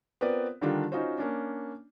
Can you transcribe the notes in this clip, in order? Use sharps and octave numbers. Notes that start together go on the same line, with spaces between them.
B3 C4 F4 A#4 B4 D5
D3 D#3 G3 D4 F4 A#4
C#4 D#4 F4 F#4 C5
A#3 C#4 D4